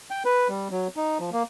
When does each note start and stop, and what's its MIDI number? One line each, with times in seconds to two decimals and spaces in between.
0.10 0.23 79
0.25 0.48 71
0.49 0.68 55
0.71 0.88 54
0.97 1.18 63
1.19 1.30 53
1.33 1.43 58